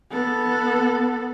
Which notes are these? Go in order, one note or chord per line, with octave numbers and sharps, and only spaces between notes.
B3 A4